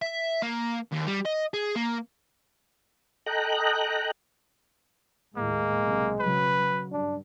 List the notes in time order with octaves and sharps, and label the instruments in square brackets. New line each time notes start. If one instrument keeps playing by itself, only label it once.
[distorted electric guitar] E5
A#3
D#2
G3
D#5
G#4
A#3
[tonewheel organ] A4 D#5 G5 A#5 F#6
[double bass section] D#2 A2 [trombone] G#3 [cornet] A#3
[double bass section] B1 C3
[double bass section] C#3 F#3 [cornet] B4
[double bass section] G2 [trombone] D4